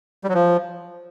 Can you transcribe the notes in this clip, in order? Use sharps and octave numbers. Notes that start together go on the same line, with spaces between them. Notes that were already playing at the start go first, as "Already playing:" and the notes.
G3
F#3
F3